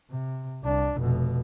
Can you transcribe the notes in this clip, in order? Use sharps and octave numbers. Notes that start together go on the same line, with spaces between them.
C3
C2 D4
F1 B2